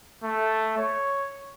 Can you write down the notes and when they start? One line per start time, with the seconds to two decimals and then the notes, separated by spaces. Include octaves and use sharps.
0.23 A3
0.78 C#5